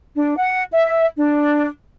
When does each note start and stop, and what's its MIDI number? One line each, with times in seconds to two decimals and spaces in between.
0.16 0.33 62
0.36 0.63 78
0.72 1.05 76
1.17 1.67 62